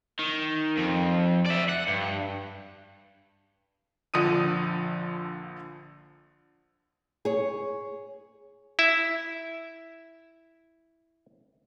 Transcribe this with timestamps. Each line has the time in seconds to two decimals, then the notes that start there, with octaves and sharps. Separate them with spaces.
0.19 D#3
0.77 F2
1.46 D5 E5
1.69 F#5
1.88 G2
4.14 A#1 D3 F3 D#6 D#7
7.25 G#4 C#5
8.79 E4 E5